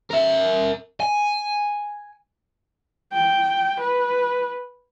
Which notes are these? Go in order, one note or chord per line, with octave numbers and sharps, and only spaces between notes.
A#4 E5
G#5
G5
B4